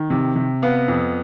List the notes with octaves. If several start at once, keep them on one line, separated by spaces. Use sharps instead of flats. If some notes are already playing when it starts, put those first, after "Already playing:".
Already playing: D#3
C3
C3
B3 F5
F2